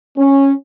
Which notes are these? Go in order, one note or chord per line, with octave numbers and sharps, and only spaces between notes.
C#4